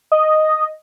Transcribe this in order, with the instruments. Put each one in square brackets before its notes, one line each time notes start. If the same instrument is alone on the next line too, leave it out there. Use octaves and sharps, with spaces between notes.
[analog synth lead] D#5